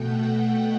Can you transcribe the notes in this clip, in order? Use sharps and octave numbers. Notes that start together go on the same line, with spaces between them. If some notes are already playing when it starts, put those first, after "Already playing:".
Already playing: B2 A3 F#5 G5
F#5